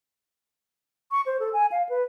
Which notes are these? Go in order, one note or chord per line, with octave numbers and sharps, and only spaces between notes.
C#6
C5
A4
G#5
F5
B4